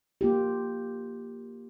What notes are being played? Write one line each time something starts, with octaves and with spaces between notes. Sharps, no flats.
A#3 F4 G4